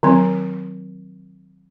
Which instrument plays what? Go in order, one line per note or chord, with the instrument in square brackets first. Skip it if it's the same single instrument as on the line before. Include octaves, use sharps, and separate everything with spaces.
[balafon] D#3 F#3 C4